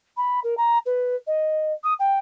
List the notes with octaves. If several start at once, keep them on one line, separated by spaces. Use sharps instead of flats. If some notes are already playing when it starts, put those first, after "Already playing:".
B5
A#4
A#5
B4
D#5
D#6
G5